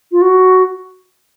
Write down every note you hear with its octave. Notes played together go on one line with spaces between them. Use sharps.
F4
F#4